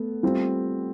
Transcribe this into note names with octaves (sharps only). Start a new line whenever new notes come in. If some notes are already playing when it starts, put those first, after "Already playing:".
Already playing: A3 B3
G3 C4 F4